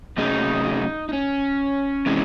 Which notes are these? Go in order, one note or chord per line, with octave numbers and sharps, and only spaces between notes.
C3 F#3 A3 C#4 D#4 G#4
D#4
C#4
C3 E3 G#3